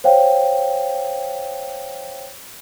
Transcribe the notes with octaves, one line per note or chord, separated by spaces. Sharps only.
C5 C#5 F5 G5